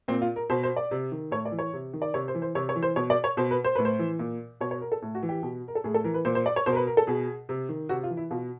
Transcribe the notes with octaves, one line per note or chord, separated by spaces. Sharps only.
A#2 C4
F4
A#4
B2 C5
C5
D5
C3
D#3
A2 C#5
D5
E3
C#5
C3
D#3
D5
C3 C#5
C5
E3
C5
C3 C#5
C#5
E3
C5
B2 C#5
D5
C#5
B2 C5
B4
C5
A2 B4
C5
E3
A#2
B2 C#5
C#5
A#4
A4
A2
F#4
E3
G4
B2
A#4
A4
A2 G#4
A4
E3 A#4
B4
A#2 C5
C5
D5
C#5
B2 C5
A#4
B4
A#4
A4
B2 G#4
C3
D#3
C3 F#4
F4
E3
E4
B2 F4